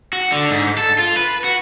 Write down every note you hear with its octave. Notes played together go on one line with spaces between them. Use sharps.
F#4
D3
G#2
A4
F4
B4
F#4